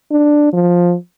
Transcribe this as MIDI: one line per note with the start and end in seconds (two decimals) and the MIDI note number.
0.11 0.49 62
0.53 0.95 53